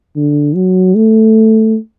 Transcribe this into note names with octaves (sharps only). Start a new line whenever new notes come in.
D3
F#3
A3